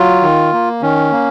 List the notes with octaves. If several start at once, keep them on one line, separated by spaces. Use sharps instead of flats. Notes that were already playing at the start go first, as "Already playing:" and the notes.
Already playing: F#3 F4
D#3
A#3
D#3 C#4
A#3